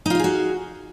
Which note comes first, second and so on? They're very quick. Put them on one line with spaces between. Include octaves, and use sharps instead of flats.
D#4 F4 F5 G#4 F#4